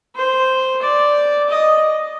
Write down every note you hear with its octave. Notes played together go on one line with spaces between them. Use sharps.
C5
D5
D#5